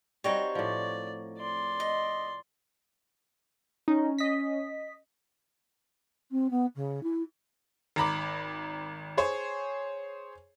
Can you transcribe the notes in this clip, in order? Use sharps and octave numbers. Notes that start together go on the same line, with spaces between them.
G3 C4 D#4 F#4 C5 C#5
A2 F3 D5
D5 C6
D#5
C#4 D#4
D#5 B6
C4
B3
C#3
E4
G#1 A#5 B5 D6
G#4 C5 C#5